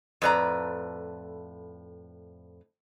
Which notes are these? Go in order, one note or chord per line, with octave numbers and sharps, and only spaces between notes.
F2 A2 B4 D5 A#5